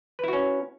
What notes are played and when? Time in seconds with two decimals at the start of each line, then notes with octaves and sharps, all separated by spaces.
0.19 B4
0.24 E4
0.28 F#4
0.33 C#4